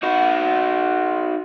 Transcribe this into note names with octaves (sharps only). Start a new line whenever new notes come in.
D#4 F#4